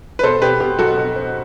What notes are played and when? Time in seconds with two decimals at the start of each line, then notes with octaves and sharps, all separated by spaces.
0.19 B4
0.23 B2 A4 C5
0.42 B2 G4 B4
0.60 B2 G4
0.79 B1 F#4 A4
0.98 B2
1.16 C4